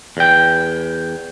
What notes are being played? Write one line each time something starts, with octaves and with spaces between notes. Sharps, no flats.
E2 G5